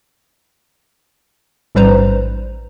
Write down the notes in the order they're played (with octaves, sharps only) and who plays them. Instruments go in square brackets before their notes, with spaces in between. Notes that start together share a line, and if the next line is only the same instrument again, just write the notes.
[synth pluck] A1 G#2 G3 B4 C5 A#5